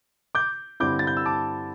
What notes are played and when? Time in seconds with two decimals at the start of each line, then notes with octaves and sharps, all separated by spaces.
0.35 D6 G6
0.80 G2 D3 C4 E4 D6 G6
0.99 A6
1.07 G6
1.17 E6
1.26 A5 D6